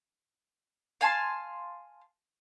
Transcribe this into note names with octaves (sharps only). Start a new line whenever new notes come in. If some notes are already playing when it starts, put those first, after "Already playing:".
F5 G#5 A5 C6